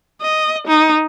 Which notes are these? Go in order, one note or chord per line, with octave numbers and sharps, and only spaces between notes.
D#5
D#4